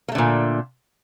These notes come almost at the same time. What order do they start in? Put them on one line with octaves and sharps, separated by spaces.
A#3 A3 D3 A#2